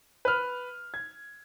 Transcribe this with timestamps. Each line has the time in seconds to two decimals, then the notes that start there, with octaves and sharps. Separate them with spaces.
0.25 B4 F6
0.94 G#6